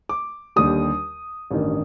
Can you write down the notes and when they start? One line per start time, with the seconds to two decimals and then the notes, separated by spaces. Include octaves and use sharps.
0.09 D6
0.56 D#2 D3 G3 D#6
1.51 A1 G2 D#3